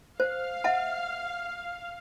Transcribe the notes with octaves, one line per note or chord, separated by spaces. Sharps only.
C5 F5
E5 F#5 A5